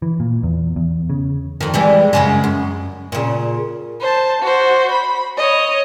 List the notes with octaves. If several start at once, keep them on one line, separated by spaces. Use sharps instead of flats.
E3
A#2
E2
E2
C#3
F2 D#3
E3 G3 G#3
F#2 C#3 G#3
F#2
A#2 C#3
C5 A5
F#4 C5
B5
C#5 D#5